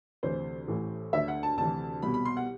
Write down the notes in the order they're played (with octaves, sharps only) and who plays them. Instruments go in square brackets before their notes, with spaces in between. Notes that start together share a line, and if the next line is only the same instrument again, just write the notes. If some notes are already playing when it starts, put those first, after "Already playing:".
[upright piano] D2 C3 E3 C5
A1 A2 E3
D2 D3 E5
F#5
A5
D2 C3 E3 A5
C2 B2 B5
B5
C6
F#5